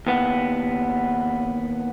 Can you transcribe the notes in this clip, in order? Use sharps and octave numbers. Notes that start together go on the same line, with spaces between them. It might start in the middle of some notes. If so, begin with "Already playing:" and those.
D#2 B3